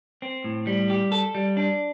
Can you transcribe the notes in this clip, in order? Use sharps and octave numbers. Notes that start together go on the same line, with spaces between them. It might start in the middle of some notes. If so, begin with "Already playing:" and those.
C4
A2
G3
G4
A4
G3
D4